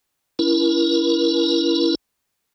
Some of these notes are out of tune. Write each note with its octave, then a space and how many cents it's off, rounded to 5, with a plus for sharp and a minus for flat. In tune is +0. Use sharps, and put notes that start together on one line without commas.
C#4 +40 E4 +20 A#4 +30